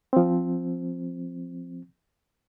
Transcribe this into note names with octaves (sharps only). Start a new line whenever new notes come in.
F3 C4